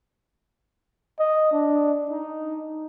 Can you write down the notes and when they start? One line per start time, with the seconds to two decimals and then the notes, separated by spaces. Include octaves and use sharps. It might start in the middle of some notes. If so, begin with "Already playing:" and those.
1.20 D#5
1.52 D4
2.11 D#4